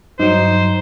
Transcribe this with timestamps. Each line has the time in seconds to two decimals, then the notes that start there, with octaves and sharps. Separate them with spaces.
0.20 G2 F#3 D#4 C5